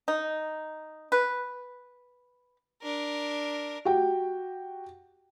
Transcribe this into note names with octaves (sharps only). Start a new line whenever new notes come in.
D#4
B4
D4 A#4
F#4 G4 G5